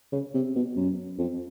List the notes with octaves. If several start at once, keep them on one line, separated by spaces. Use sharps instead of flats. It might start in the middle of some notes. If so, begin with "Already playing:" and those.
C#3
C3
B2
F#2
F2